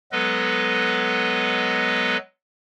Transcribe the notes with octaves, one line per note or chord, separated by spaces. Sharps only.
F#3 G#3 B3 A4 B4 D#5